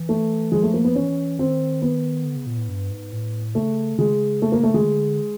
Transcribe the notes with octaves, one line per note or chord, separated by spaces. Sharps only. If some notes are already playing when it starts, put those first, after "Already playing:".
Already playing: E3
A3
F3 G#3
A3
A#3
B3
E3 C#4
D#3 C4
B3
D3
C#3
A#2
A2
G2
G#2
A2
C#3 A3
C#3 G#3
A3
A#3
A3
G#3
D3